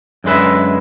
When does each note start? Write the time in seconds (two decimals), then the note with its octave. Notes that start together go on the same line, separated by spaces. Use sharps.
0.24 F#2 D3 G#3 B4 E5